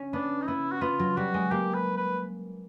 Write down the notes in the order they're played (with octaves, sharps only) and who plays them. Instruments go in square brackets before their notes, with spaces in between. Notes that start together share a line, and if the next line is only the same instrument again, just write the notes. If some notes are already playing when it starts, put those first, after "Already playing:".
Already playing: [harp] C#4
[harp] B3 [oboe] D4
[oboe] D#4
[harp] B3 [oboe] E4
[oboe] F#4
[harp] B3 [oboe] F4
[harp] F#3
[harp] G3 [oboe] F#4
[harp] G#3
[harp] A#3 [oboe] G4
[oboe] B4
B4